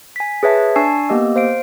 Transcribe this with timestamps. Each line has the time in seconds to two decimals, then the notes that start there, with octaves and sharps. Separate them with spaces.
0.16 G#5 B6
0.43 G#4 B4 C#5 E5 A5
0.76 D4 G#5 A5 C#6 E6 C7
1.09 A#3 B3 G4 D#5 E6
1.36 C5 F5 D7